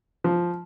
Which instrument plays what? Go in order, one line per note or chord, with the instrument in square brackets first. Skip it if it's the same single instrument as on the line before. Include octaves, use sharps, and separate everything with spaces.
[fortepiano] F3